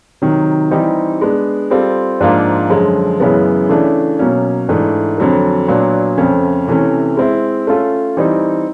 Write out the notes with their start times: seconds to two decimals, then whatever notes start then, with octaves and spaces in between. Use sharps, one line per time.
0.22 C3 D#3 F#3
0.71 E3 G3 C4 D#4 G4
1.21 G#3 B3 D4
1.71 G3 C4 F4 A4
2.20 G#2 F3 A#3 D4 F4
2.70 F#2 D3 F3 G#3
3.20 F#2 C#3 E3 G#3 B3
3.69 C#3 E3 A3 D4
4.19 B2 F#3 A#3 C#4
4.69 G#2 E3 A3 D4
5.18 F2 D3 F#3 A3
5.68 A#2 F#3 B3 D4
6.18 F2 C#3 F3 A3 C#4
6.68 C3 E3 A3 C#4
7.17 G#3 C4 E4
7.67 A3 C#4 F4 A4
8.17 E3 G3 C4 D#4